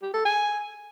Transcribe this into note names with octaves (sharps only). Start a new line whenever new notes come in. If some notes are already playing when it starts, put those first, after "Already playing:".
G4
A4
G#5